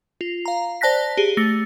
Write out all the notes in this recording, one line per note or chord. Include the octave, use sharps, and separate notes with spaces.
F4
F5 A#5
C5 D5 A5 F#6 A#6 B6
G4 G#4
A3 A#6 C#7